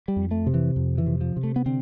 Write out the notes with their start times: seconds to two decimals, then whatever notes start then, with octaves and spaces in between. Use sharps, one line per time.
0.08 G3
0.16 F2
0.31 A3
0.47 C3
0.54 E3
0.76 F2
0.98 E3
1.07 C3
1.21 F3
1.36 C3
1.43 A3
1.56 B3
1.66 D3 C4